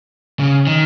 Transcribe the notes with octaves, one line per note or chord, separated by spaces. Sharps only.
C#3
D#3